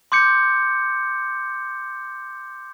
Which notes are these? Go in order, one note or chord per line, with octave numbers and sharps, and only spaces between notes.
C6 D6 G6 C#7